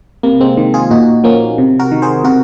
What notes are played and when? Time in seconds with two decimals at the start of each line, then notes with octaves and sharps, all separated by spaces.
0.23 C3 A#3
0.40 G#3 C4
0.57 D#3
0.74 F4 G#4
0.91 A#2 D#4 F#4
1.24 F3 A#3 C#4
1.58 C3
1.79 F#4 A#4
1.92 D#3
2.02 G#4 C5
2.24 C3 F#4 A#4